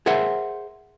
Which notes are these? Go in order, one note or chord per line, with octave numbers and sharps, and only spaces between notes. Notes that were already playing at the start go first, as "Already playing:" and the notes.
G#4 A#4 C5 E5 F#5